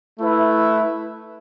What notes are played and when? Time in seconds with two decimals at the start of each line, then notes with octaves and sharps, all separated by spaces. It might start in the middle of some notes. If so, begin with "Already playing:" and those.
0.20 A3 E4 B4 E5